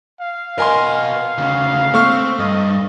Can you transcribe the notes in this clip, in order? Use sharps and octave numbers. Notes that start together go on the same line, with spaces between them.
F5
A#4 B4 D#5 G#5 C6
D2 C#3
A3 C4 C#6 F6
G2 D#5